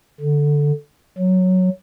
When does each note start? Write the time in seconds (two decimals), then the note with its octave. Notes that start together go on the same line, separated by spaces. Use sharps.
0.20 D3
1.18 F#3